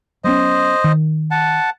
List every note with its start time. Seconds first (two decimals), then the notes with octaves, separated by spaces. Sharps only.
0.24 F#3 B3 C#4 C5 D#5
0.84 D#3
1.31 F#5 A5